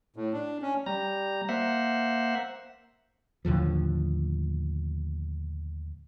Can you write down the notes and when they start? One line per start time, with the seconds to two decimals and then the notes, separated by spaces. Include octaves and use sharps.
0.16 A2
0.33 D4
0.62 C#4
0.86 G3 A#5
1.49 A#3 C5 E5 F#5
3.45 D#2 A2 D3 F3